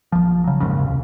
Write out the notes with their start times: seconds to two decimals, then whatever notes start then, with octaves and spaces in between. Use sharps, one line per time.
0.12 A#1 F3
0.44 C#3 F#3
0.60 F1 D#2 G#2 C#3
0.79 D1 C2